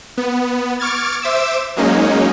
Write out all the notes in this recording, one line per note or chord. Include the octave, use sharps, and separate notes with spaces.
B3
C#6 D6 F6 G#6 A6
C5 E5 D6 E6 E7
F#3 G#3 A#3 C#4 D#4